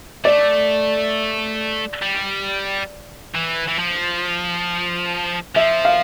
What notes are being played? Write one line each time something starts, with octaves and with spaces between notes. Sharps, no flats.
A3 D5
G3
E3
E3
F3
F3 E5
F5